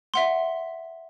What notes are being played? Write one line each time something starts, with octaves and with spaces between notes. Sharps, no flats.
E5 F#5 C6